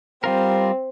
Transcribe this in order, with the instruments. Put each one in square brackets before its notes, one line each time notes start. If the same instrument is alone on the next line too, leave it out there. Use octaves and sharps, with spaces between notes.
[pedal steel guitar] G3 F4 A#4 [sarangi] C4